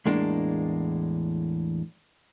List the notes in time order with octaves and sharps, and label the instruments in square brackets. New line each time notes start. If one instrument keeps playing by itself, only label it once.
[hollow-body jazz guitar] E2 A2 G#3 A#3 D4